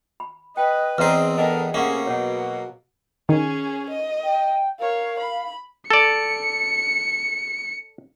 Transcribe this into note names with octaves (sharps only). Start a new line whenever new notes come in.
B5
B4 D#5 G5
E2 C4 G#4 B4 D#5 F5 A#5
B3 D4 A4 A#4 D#5 G5
C3 A3 A#3 C#4 G#4 F5 F#5
B2 F#3 C#5 F#5
D#3 C#4 G#4
D#5
G5
A#4 C#5 F5
B5
A4 D5 C#7